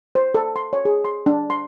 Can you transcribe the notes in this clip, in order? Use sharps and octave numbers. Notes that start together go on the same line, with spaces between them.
C5
A4
C6
C#5
G#4
C6
D4
C6